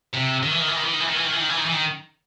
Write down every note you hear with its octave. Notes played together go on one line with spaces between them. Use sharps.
C3
D#3
E3
D#3
E3
D#3
E3
D#3
E3
D#3
E3
D#3
E3
D#3
E3
D#3
E3
D#3